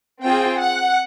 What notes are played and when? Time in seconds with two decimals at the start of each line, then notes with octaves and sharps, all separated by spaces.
0.22 C4 F4 G#4 G5
0.59 F#5